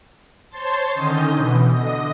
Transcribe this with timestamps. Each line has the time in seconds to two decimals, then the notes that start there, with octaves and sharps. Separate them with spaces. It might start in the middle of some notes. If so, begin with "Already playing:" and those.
0.49 C5 C#5 A5 C6 A6
0.93 D3 D#3 C#4 D#5 G6
1.32 B2 E3
1.68 D3 D#5